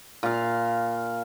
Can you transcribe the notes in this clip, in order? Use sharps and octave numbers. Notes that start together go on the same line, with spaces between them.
A#2 F5